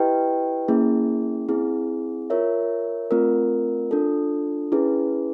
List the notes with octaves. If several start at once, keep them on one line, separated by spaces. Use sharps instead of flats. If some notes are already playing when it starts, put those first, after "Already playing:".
Already playing: E4 G4 B4 D#5 G5
A#3 C#4 E4 G#4
C4 E4 G#4
F4 A#4 C#5 E5
A3 C4 F4 A#4
D4 F4 A4
C#4 E4 G#4 B4